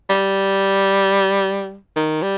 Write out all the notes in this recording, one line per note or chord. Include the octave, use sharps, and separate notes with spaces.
G3
D#3
G3